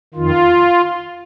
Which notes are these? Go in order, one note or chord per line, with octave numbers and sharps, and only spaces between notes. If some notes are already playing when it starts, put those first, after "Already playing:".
F2 D#3 F4